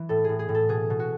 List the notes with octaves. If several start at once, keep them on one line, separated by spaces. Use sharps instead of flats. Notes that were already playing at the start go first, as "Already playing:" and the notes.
Already playing: E3
A2 A4
A2 G#4
G#4
A2
A4
B2 G#4
B2
F#4